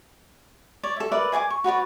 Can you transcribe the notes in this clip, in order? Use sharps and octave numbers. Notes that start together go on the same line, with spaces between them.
C#5 D5
A4 E5
A#4 B4 D5 E5
G#4 G#5 A5 D6
C#6
F#4 B4 C#5 D5